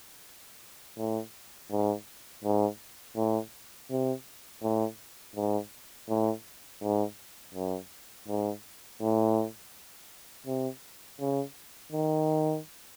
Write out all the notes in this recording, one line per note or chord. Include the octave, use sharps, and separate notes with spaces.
A2
G#2
G#2
A2
C3
A2
G#2
A2
G#2
F#2
G#2
A2
C3
C#3
D#3